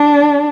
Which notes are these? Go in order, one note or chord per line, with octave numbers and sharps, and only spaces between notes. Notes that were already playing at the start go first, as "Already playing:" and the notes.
Already playing: D4